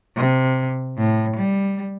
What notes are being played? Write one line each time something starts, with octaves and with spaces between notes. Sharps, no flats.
C3
A2
G3